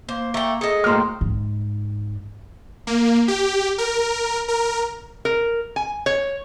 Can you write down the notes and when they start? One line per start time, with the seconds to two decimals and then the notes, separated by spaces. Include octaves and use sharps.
0.09 A#3 C5
0.34 A3 G5 A#5
0.61 G#4 A4 D#5
0.84 A2 A#3 C5 G5 F6
1.21 G#2
2.87 A#3
3.28 G4
3.78 A#4
4.48 A#4
5.25 A#4
5.76 G#5
6.06 C#5